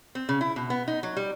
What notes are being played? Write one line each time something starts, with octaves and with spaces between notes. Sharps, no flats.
C4
C#3
E4
B2
B3
D#4
F#3
G3